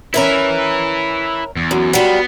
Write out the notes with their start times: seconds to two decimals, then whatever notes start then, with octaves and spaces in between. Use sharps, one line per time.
0.14 C#4 E4 A#4 B4 E5
1.57 E2
1.71 F#2
1.93 F#3 G3 B3 F4